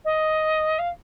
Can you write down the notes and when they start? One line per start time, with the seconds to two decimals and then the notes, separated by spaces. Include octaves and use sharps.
0.04 D#5
0.78 F5